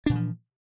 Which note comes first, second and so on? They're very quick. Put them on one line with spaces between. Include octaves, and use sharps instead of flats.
D4 A#2 E3 F3